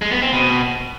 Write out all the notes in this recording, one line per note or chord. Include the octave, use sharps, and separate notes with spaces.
G#3
B3
C4
B2